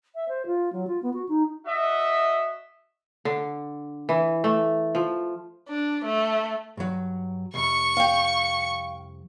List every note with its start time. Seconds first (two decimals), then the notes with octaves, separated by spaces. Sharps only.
0.15 E5
0.29 C5
0.46 F4
0.73 F#3
0.87 F4
1.03 B3
1.14 F#4
1.29 D#4
1.66 F#4 D#5 E5
3.25 D3
4.09 E3
4.44 A3
4.95 F3
5.69 D4
6.05 A3
6.77 G2 F#3
7.54 C2 F2 C#6 C#7
7.97 F5 G5